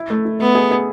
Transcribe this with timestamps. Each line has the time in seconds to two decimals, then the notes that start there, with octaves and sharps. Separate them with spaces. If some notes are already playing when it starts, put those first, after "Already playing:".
Already playing: E4
0.10 A3
0.25 E4
0.40 A3 B3
0.55 G#4
0.71 G#4